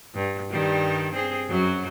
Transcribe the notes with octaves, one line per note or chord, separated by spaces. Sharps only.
G2
G2 D#3 G3
C4 G#4
F#2 F#3